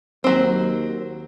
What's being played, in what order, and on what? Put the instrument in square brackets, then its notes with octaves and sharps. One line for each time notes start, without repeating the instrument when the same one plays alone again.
[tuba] D#2 [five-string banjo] F#3 C4